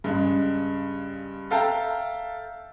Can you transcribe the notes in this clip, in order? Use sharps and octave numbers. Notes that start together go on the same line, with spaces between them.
G2 C#3 G#3
A4 E5 F5 G5 A5 A#5